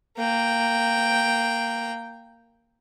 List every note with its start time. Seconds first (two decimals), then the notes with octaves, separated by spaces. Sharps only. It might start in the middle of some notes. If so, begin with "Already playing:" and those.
0.18 A#3 G5